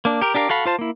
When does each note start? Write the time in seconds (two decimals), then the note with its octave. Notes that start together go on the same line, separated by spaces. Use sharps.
0.05 A#3 D4
0.22 G4 A#4
0.34 D4 G4 A#4 F5
0.49 F#4 A4 F5 B5
0.65 F4 C5 A5
0.79 A#3 E4